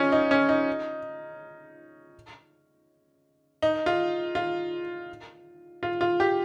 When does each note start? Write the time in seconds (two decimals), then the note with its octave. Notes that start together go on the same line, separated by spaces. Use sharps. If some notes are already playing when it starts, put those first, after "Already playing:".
Already playing: C#4 D#4 F4
0.12 D#4
0.31 C#4
0.49 D#4
3.62 D#4
3.86 F4
4.35 F4
5.83 F4
6.01 F4
6.20 G4